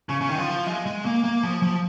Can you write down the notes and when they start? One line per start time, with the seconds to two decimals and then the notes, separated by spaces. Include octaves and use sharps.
0.09 C#3
0.21 C#3
0.29 D#3
0.38 F3
0.67 G#3
0.86 G#3
1.05 A#3
1.24 A#3
1.43 F3
1.62 F3